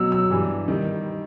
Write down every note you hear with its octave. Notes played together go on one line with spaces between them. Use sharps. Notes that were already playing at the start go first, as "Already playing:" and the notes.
Already playing: B2 F#3 E6
E6
G2 E3 G3
D#3 G3